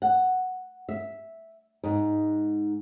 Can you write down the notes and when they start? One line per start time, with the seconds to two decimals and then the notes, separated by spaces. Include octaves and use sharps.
0.02 F#5
0.89 E5
1.84 G#2